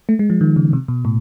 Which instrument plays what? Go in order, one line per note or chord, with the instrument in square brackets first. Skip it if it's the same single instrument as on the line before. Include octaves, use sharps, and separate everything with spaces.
[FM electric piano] A3
G#3
F3
D#3
C#3
C3
B2
A2